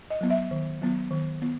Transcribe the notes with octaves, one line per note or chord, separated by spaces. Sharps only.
D#5
F#3 B3
E5
D#3
F#3 B3
D#3
B3